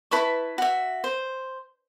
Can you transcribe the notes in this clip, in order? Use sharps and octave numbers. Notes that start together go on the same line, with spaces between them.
E4 B4 A5 C#6
F#4 E5
C5